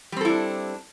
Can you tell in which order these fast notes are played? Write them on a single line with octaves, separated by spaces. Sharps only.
G3 C4 A4 E4 D4